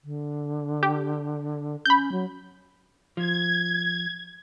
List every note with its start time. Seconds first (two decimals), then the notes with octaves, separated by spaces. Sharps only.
0.04 D3
0.83 G4
1.86 C#4 B5 G6
2.12 F#3
3.17 F3 G#6